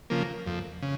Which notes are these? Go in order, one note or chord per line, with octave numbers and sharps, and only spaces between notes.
C#3 F3 A#3
F2
C#3